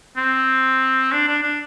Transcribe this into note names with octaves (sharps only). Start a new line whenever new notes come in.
C4
D4
D4
D4